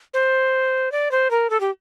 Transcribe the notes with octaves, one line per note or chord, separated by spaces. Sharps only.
C5
D5
C5
A#4
A4
G4